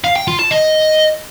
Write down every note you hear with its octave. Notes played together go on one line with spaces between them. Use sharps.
F5
G5
F4
A5
D#5